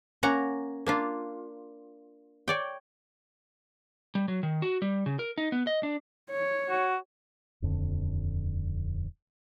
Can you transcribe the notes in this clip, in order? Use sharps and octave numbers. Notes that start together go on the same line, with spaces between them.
A#3 C#4 F#5 A#5
A#3 D4 F4
C#5 D5 G5
G3
F#3
D#3
F#4
G3
C#3
A#4
D#4
B3
D#5
D4
C#5
F#4
D#1 F2 D3